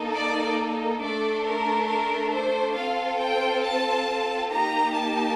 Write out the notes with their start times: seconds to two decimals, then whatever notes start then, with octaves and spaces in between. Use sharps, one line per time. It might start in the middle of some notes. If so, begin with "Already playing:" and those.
Already playing: A#3 D#4 A4
0.12 D5
1.00 A3 D4 A4 D5
1.44 A#4
1.87 A#4
2.32 C5
2.75 C4 F4 A4 F5
3.20 G5
3.63 A5
4.51 A#3 D#4 G4 A#5
4.95 A5